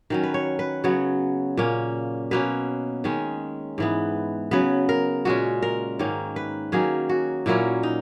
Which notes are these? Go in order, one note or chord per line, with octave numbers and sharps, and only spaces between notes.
D#3 F#3 C#4 A#4
B4
C#5
B4
C#3 F#3 B3 C#5
A#2 A#3 C#4
B2 A#3 C#4 B4
D#3 G#3 C#4
G#2 E3 B3
C#3 F#3 B3 B4
A#4
A#2 G#3 C#4 F#4
A#4
G#2 D#3 A#3 C#4
B4
D#3 F#3 A#3 C#4 G#4
F#4
A#2 F#3 A#3 C#4 E4
D#4